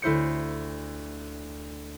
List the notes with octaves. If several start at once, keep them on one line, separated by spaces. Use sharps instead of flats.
D2 E4 C5 C#7